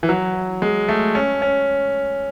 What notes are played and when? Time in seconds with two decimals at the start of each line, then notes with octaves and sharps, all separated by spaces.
0.03 E3
0.09 F#3
0.62 G#3
0.89 A3
1.15 C#4
1.42 C#4